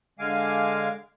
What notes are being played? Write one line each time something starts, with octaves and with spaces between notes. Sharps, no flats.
D3 G#3 F5 G#5 D6